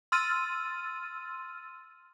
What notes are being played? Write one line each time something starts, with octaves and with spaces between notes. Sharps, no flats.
C6 E6 F6 A6 D#7